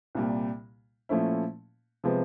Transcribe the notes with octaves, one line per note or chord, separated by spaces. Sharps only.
C2 A#2 G3
A#2 F3 A3 C#4 E4
C3 F3 G#3 B3